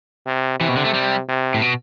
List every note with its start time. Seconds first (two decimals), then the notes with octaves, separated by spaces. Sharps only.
0.27 C3
0.60 C3 E3
0.69 B2
0.77 D3
0.85 A3
0.94 G3
1.29 C3
1.54 A2
1.62 B2